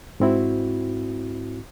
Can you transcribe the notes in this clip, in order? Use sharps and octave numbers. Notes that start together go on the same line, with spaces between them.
G#2 C4 E4 F#4